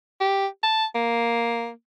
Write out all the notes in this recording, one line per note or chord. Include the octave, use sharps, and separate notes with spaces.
G4
A5
A#3